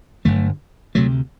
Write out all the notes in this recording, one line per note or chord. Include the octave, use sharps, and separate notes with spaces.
G1 G2 D3 F#3 A3
D2 C3 F#3 A3